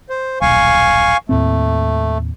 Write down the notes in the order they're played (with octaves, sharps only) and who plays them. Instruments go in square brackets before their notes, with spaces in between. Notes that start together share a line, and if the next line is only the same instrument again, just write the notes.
[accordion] C5
[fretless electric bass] D#1 B1 [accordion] F5 G#5 C#6
[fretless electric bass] D#2 A2 C4 [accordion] A3